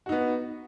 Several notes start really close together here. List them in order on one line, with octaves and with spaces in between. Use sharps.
F#4 D#4 B3